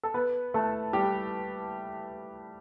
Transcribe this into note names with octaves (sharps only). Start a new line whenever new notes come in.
A4
B3 B4
A3 A4
G3 G4